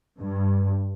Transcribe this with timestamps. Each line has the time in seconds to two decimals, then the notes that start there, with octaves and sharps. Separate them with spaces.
0.19 G2